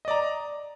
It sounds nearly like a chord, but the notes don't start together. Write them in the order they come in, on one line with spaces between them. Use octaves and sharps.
D#5 D5 A#5